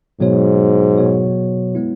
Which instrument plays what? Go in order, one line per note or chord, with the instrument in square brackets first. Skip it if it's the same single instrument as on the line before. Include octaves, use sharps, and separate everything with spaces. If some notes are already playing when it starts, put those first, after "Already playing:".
[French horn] G#2 [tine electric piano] B2 F#3 B3 F#4 C#5
[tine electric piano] B2 F#3 B3 F#4 C#5
G#3 B3 E4